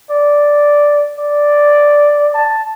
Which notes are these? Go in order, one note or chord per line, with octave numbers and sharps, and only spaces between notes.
D5
D5
A5